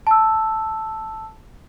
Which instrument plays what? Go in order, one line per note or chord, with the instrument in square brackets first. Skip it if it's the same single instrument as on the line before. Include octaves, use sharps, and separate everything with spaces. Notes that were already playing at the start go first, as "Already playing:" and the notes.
[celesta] A5 E6